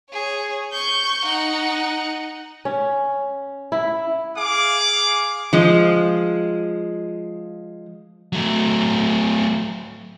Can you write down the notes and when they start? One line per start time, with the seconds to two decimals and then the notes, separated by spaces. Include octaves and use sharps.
0.11 G#4 C#5
0.72 C#6 G6
1.25 D#4 F#5
2.65 C#4
3.72 E4
4.37 G#4 F5 D6
5.53 F3 G#3
8.33 F#3 A3